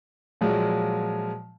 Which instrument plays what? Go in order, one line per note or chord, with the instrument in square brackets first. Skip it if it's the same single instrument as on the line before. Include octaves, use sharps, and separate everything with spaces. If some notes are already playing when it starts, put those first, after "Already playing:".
[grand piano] A#2 F3 F#3 G#3